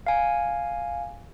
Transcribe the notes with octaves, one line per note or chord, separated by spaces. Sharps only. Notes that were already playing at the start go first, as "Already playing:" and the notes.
F5 G#5